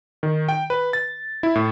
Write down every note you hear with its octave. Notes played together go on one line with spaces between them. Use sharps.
D#3
G5
B4
A6
E4
A2